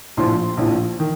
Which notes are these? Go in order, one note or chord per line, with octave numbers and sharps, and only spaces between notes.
A#1 A2 F3 C6
A#1 A2 F3
D#3